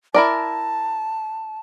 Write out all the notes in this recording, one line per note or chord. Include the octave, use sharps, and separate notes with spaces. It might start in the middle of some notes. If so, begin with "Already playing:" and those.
E4 A#4 D5 A5